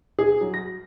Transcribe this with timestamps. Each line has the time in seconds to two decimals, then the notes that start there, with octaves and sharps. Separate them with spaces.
0.19 G#4
0.41 F#3
0.54 A#6